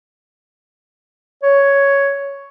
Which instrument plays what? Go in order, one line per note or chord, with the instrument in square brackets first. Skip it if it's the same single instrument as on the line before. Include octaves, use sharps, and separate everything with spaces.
[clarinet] C#5